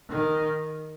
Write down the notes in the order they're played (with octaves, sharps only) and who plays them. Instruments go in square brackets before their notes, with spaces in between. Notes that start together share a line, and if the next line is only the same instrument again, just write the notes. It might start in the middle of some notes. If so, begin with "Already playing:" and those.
[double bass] D#3